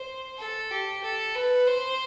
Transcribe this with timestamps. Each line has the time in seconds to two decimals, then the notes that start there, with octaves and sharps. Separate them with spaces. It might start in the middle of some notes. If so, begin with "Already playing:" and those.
Already playing: C5
0.38 A4
0.71 G4
1.03 A4
1.35 B4
1.67 C5